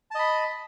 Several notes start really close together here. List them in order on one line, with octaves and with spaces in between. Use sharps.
A5 D#5 B5